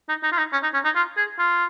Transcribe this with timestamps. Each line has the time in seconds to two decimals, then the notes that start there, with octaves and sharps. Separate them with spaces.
0.09 D#4
0.23 D#4
0.32 F4
0.38 D#4
0.52 C#4
0.63 D#4
0.74 C#4
0.85 D#4
0.95 F4
1.17 G#4
1.39 F4